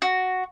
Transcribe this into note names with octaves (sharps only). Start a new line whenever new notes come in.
F#4